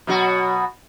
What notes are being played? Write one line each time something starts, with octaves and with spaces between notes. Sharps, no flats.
B2 F#3 F#4